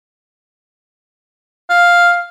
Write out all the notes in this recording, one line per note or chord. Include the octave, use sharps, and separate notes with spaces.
F5